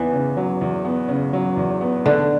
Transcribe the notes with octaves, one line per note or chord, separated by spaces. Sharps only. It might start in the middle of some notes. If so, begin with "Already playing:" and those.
Already playing: E2 E3 B3
C#3
F#3
E2
B3
C#3
F#3
E2
B3
D3 A3